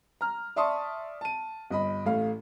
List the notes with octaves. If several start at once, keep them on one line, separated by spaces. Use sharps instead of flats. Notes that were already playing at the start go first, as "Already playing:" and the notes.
A#5 F6
D5 E5 A5 C6 C#6 D#6
A5 D#7
G1 D#5 B5
A1 A3 F5